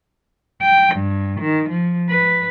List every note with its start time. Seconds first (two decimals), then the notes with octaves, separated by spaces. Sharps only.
0.62 G5
0.95 G2
1.40 D#3
1.69 F3
2.10 B4